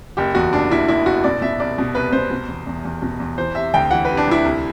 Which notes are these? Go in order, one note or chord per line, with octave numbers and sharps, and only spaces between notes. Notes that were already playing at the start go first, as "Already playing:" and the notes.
F#1 G4
E2 F#4
F#1 D4
F#1 E4
F#1 E4
F#1 F#4
B2 D5
B2 E5
C2 D5
B2
C2 B4
B2 C5
B2
E2
E2
E2
B2
E2
E3 C5
C3 E5
D2 G5
E3 F#5
B4
C3
D4
D2 E4
C2